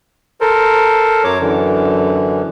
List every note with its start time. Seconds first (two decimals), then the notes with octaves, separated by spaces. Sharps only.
0.41 A4 A#4 C5
1.24 F#2 F#3 C#5 D6
1.40 F#2 D3 E3